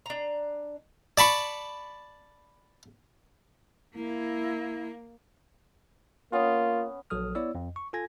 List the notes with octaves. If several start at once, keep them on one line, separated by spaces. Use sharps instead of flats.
D4 A#5
D5 A5 B5 C#6
A#3 E4
A#3 B3 C#4 F4
A#1 F#3 A4 D#6 F6
B3 E4 C#5 D5 E6
F2
C#6
F4 A4 G#5 G#6 A#6